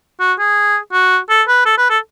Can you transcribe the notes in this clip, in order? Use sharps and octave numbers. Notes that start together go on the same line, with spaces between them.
F#4
G#4
F#4
A4
B4
A4
B4
A4